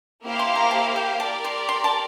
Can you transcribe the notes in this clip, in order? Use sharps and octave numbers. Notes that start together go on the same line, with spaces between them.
A#3 E4 G4 C5 F5
C6
A#5
A5
G5
G4 A#4 D5 A5
C6
C6
A5